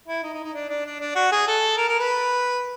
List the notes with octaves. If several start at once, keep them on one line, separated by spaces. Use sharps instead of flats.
E4
D#4
D#4
D#4
D4
D4
D4
D4
F#4
G#4
A4
A#4
A#4
B4